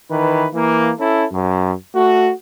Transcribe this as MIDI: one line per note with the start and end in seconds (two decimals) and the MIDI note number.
0.10 0.47 51
0.10 0.47 52
0.10 0.47 71
0.54 0.92 52
0.54 0.92 58
0.99 1.25 61
0.99 1.25 64
0.99 1.25 69
1.32 1.72 42
1.94 2.32 57
1.94 2.32 66